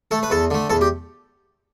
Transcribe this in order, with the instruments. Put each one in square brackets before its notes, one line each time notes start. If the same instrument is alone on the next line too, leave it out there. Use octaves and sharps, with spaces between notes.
[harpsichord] A3 A4
B4
E2 A4
D3 A3
E2 A4
G4